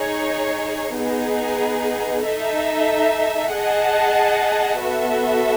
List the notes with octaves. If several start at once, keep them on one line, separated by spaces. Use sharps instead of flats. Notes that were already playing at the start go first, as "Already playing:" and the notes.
Already playing: D#4 G#4 C#5
B3 D#4 G#4
D#4 A4 E5
G#4 D#5 F#5 A5
B3 F#4 A4 E5